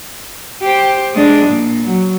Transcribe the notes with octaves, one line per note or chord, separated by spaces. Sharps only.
G4 C5
G#3 D4
A#2
F#3